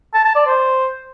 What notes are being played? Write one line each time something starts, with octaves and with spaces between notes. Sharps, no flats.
A5
A5
D5
C5